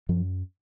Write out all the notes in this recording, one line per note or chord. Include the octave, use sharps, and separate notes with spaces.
F#2 F3